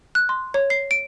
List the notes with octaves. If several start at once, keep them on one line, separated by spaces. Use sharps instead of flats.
F#6
C6
C#5
C7
D7